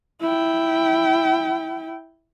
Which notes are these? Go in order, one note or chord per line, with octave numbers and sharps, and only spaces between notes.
E4 G5